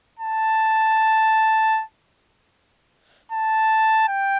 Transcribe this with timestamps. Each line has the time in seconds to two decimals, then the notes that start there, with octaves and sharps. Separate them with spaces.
0.19 A5
3.32 A5
4.09 G5